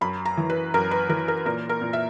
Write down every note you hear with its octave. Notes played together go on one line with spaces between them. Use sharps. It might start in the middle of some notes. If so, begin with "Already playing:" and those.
F#2 B5
A#5
E3
B4
F#2 A#4
B4
E3 A#4
A#4
A#2 A#4
A#4
A#2
E5